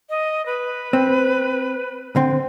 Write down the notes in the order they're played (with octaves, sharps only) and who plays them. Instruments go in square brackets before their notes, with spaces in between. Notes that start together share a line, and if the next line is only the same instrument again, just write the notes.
[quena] D#5
B4
[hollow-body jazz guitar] C4
D3 C4